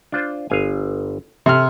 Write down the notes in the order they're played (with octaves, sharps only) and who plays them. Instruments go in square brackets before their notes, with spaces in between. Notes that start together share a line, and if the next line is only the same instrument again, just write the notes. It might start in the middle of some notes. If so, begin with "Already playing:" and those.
[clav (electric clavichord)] D4 F4 C5
G1 F5 G#5
[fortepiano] C3 F6 [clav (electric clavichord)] A4